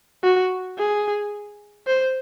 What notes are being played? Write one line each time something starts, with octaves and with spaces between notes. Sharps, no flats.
F#4
G#4
C5